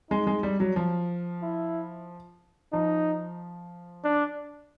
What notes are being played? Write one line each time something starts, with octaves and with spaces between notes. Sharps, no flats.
G#3 D#4
G#3
G3
F#3
F3
E4
F3 D#4
D4